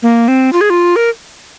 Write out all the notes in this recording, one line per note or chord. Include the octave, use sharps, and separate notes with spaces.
A#3
C4
F4
G#4
F4
A#4